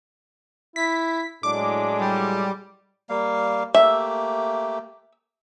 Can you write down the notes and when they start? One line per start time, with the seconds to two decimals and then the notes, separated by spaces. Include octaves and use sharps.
0.76 E4 B6
1.43 A2 F#3 G#3 D4 D6
1.99 G3
3.09 G3 A#3 F5
3.74 A3 A#3 G4 E5